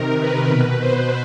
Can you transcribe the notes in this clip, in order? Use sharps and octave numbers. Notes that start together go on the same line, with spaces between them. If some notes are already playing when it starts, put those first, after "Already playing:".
Already playing: C3 D#3 A#4
B4
B2
C5